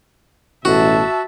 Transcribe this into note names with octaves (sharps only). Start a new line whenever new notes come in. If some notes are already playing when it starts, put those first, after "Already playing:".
A1 B2 A3 F#4 E5 A5